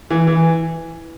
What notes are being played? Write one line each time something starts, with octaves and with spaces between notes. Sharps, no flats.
E3
E3